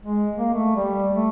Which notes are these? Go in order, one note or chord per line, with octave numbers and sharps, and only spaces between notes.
G#3
A#3
A3
G3
A3